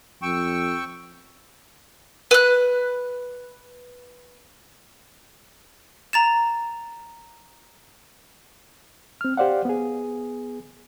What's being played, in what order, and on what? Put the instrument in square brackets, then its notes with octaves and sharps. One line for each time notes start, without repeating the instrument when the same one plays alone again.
[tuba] F2 [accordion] G5 C#6 E6
[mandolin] B4 F#6
[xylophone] A#5 A6 E7
[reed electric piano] C4 F6
G4 C5 D5 F5 F#5
B3 G#4